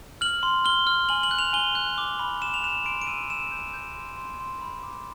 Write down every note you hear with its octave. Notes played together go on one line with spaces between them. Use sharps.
F6 F#7
C6
F6 G7
F6
G#5 F#7
F#7
F#6
F7
G#5 G7
F#6
D6
B5
D6 E7
F7
F#6 E7
C6 D7
D7
E6 D#7
E6 E7
G6
G6
C6
C6
C6
B5
D6